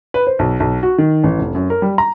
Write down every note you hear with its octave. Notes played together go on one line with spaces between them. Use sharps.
B4
C5
B1
B1
F#4
D#3
A1
F1
F#2
A#4
G3
A#5